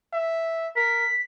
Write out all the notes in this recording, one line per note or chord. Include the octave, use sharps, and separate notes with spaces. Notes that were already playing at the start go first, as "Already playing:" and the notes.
E5
A#4 B6